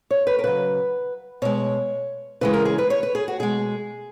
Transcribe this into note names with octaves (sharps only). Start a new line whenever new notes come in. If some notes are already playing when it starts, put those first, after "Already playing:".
C#5
B4
A#4
C#3 F#3 B4
B2 G#3 C#5
C#3 E3 G#3 B4
A#4
G#4
B4
C#5
B4
G#4
F#4
B2 G#3 G#4